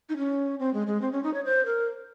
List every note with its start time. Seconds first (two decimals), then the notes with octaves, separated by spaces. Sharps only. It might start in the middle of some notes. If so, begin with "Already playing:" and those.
0.09 D#4
0.17 C#4
0.59 C4
0.74 G#3
0.87 G#3
1.02 C4
1.12 C#4
1.24 D#4
1.34 C#5
1.45 C5
1.66 A#4